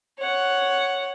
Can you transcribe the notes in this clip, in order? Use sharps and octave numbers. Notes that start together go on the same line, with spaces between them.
C#5 F#5